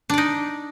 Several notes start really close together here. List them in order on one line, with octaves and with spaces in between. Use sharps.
D4 D5 D#4